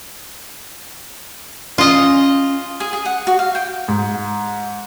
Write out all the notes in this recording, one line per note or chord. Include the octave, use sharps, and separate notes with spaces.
C#4 F4 D#5
G#4
G#4
F#5
F#4
F5
G5
G#2